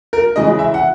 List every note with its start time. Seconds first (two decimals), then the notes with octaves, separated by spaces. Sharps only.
0.13 A#4
0.36 C#3 E3 G#3 D#5
0.59 E5
0.74 F#5